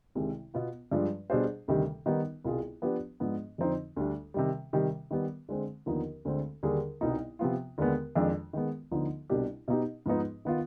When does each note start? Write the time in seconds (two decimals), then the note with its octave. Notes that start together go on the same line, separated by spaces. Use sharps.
0.15 C2 C3 D#3 G#3
0.54 B2 B3 F4
0.91 G2 F3 G#3 D4
1.30 B2 G3 D4 G#4 C5
1.68 D2 C3 D#3 G3
2.06 D#3 G3 B3 D#4
2.44 C2 B2 B3 F4 G#4
2.82 F3 B3 D4 G4 B4
3.20 G#2 F3 B3 D4
3.58 F2 D3 F3 C4 D#4
3.96 D2 D3 G3 D4
4.34 C3 D#3 G3
4.73 C3 D#3 G3
5.11 D#3 G3 B3
5.49 D3 G#3 C4
5.86 D#2 D3 F3 B3 D#4
6.25 D2 D3 G#3 C4
6.63 D#2 D3 G3 D4 G#4
7.01 C2 B2 B3 D#4
7.39 C3 F3 B3 F4
7.78 D#2 D3 G#3 B3
8.15 F2 D#3 G#3 D4 F4
8.53 D#3 G#3 B3
8.91 D2 D3 F3 B3 D#4
9.30 C2 B2 G3 D4 G4
9.68 B2 B3 D#4 G4
10.06 G#2 F3 B3 D#4 B4
10.45 D#3 B3 F4